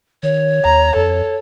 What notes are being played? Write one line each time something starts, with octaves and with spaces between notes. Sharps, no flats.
D#3 C#5
D#2 A#5
F2 A4